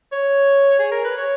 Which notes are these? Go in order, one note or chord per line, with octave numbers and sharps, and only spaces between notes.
C#5
G#4
A#4
B4
C#5